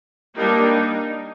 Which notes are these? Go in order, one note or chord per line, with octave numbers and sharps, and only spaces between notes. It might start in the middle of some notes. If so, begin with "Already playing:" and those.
G3 A#3 D4 D#4